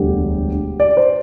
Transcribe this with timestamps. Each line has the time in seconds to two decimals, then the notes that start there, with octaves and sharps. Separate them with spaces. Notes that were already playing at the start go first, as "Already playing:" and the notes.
Already playing: E1 D2 D3 G3 G4
0.80 D5
0.97 C5